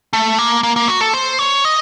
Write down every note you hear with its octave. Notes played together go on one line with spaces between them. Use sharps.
A3
A#3
A#3
A#3
F#4
A4
C5
C#5
D#5